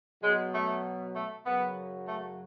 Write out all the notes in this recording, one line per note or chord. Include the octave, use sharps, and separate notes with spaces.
B2 F#3 G#3
A3
A3
F#2 C#3 F#3 B3
A3